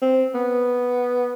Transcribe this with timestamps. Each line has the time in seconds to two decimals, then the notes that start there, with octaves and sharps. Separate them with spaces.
0.02 C4
0.34 B3